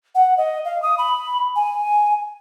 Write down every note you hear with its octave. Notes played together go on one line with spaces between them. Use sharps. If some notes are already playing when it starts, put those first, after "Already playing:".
F#5
D#5
F5
D#6
B5
G#5